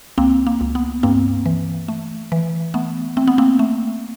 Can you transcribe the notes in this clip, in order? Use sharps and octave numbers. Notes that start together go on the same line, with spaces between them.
C#2 A#3 C4
A#3
C#2
B3
G2 A#3 C4
E3
A3
E3
A3 B3
A3 C4
B3
A#3 C4
A3